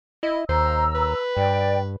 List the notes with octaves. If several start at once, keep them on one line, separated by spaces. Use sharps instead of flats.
E4 D#5
D#2 C5 A#5 E6
B4
G2 D5 G5